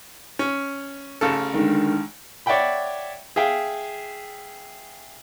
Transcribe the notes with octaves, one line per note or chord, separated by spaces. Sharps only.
C#4
A1 C#3 A4
D3 D#3 G#3
C#5 D5 E5 F#5 G5 B5
G#4 E5 F5 G5